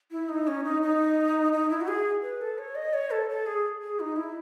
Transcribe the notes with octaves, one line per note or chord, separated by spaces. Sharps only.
E4
D#4
C#4
D#4
D#4
D#4
E4
F#4
G#4
B4
A4
C#5
D#5
C#5
A4
A4
G#4
G#4
D#4
E4